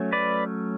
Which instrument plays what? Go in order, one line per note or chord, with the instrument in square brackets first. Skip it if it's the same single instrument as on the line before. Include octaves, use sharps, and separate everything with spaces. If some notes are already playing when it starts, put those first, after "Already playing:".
Already playing: [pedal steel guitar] F#3 A3 C#4
B4 D5